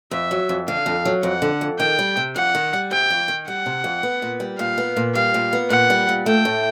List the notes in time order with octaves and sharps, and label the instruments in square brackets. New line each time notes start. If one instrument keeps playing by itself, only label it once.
[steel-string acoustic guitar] F2 [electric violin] E5
[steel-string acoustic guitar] F#3
F2
[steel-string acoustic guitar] D3 [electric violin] F5
[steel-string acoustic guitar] F2
F#3
[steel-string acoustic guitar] F2 [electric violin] F#5
[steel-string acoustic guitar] D3
F2
[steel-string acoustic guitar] D#3 [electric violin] G5
[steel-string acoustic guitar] G3
C3
[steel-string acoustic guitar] F2 [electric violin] F#5
[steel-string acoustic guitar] D#3
G3
[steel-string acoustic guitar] C3 [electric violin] G5
[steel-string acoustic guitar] F2
D#3
[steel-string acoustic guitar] G3 [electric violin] F#5
[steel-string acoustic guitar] C3
F2
B3
A#2
G3
[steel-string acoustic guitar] A#2 [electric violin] F5
[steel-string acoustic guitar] B3
A#2
[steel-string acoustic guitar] G3 [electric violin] F5
[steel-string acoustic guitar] A#2
B3
[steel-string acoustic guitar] A#2 [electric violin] F#5
[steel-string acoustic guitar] G3
A#2
[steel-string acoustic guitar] A3 [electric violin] G5
[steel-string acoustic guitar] A2